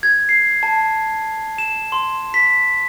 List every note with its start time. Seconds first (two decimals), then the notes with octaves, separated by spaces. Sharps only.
0.03 G#6
0.29 C7
0.63 A5
1.58 E7
1.92 C6
2.34 B6